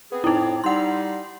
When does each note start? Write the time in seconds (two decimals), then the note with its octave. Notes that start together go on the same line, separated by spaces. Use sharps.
0.11 B3 C4 G#4
0.24 F2 A2 C4 D#4 E4
0.64 G3 D#4 F#5 C6